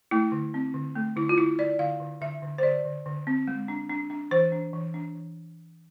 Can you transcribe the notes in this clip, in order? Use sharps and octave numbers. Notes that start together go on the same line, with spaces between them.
A3 E4
D3
C4
D3
A3
D3 E4
F4
D3 E4
D3 D5
D3 F5
D3
D3 E5
D3
C5
D3 D5
D3
D3
C4
G#3
D4
D4
D4
E3 C5
D4
E3
D4
E3